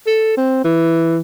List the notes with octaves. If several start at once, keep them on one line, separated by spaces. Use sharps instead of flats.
A4
C4
E3